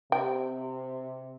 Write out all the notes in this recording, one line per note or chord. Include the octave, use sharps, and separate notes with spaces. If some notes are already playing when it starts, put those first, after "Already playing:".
C3 G5